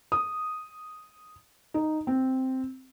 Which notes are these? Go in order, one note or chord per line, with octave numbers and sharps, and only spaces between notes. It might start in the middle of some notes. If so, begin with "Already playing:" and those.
D#6
D#4
C4